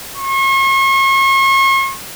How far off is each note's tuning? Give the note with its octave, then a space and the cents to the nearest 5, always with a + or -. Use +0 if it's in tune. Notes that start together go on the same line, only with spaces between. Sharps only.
C#6 -40